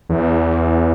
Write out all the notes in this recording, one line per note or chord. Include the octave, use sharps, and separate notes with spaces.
E2